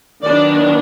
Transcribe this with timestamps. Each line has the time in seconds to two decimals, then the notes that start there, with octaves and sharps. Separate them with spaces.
0.23 D#3 F#3 B3 D4 D5